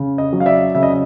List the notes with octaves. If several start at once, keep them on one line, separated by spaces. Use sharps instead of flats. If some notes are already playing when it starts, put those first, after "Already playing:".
Already playing: C#3
D#5
F#3
F5
D5 E5
C#3 E5
D#5